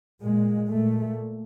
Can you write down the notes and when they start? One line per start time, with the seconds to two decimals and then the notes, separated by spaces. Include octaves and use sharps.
0.23 A#2 G#3
0.72 A#2 A3